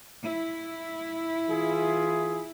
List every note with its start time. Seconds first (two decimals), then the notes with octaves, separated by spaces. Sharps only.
0.23 E4
1.50 E3 F4 G#4